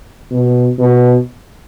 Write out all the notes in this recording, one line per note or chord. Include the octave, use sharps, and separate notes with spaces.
B2
B2